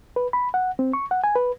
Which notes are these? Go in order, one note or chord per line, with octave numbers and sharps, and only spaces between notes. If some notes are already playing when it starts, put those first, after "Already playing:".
B4
B5
F#5
C4
C#6
F#5
G#5
B4